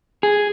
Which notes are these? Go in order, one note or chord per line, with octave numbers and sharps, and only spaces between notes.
G#4